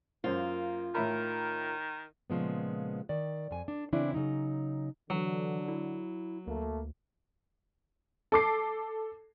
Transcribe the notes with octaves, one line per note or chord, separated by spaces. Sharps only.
F#2 A#3 F4 C5
A2 D#3 A#4 E5 B5
A#2 C#3 F3 G#3 B3
D#3 D5
F2 G#5
D4
C#3 E3 C4 D4 E4
C#3 F#3 D#4
D3 E3 F#3
E4
D2 A3 A#3
A4 D6 C7